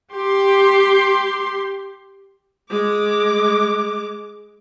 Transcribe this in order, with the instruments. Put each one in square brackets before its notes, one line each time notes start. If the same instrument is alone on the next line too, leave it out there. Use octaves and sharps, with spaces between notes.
[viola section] G4 C6
[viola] G#3 D6